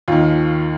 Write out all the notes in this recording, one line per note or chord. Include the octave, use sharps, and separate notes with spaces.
D#2 D#3 F4